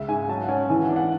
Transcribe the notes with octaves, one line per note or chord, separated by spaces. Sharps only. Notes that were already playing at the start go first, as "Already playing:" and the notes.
Already playing: C#2 G#3 E5
G#2 G#5
F#3 A5
F#5
C#4 G#5
E3 G#5
F#5
D4
F#5